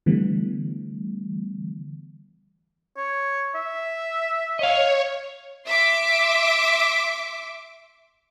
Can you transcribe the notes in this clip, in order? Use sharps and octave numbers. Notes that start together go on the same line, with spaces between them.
D3 E3 G3 A3 B3
C#5
E5
C#5 D#5 F5
E5 C6 D6